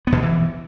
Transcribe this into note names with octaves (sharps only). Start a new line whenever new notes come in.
B3
B2
D#3
E3